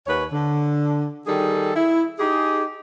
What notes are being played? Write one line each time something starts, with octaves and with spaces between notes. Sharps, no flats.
D#2 B4 C#5
D3
D#3 G3 G#4 A4
E4
D#4 G4 G#4